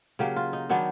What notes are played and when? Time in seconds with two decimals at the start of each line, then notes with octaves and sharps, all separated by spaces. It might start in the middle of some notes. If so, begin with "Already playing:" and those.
0.19 C#3 F#3 A#3 G4
0.36 F4
0.53 D#4
0.69 D#3 F#3 B3 D4